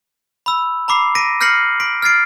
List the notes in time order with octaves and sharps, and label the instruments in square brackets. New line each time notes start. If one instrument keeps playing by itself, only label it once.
[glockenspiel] B5 E6
A#5 B5 D6 C7
A#6 B6 D7 D#7
F6 G6 A#6 C7 C#7 F#7
C6 B6 D7
F6 G#6 A6 C7 D7